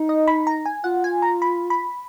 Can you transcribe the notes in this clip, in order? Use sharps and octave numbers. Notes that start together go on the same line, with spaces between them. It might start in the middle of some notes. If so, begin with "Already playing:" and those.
Already playing: D#4
D#5
B5
A#5
G#5
F4 F#5
G#5
A#5
B5
B5